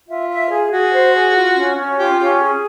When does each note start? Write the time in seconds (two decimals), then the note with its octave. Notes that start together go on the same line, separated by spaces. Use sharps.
0.09 F4 E5
0.30 E5
0.51 G#4
0.72 F#4 G#4
0.92 C5
1.14 G#4
1.35 F4
1.56 C#4
1.77 C#4
1.98 F4 G4
2.20 C#4 G4
2.41 G#4